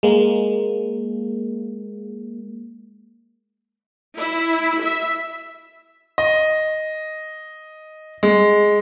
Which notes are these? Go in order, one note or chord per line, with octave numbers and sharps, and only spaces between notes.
G#3 A#3
E4
E5
D#5
G#3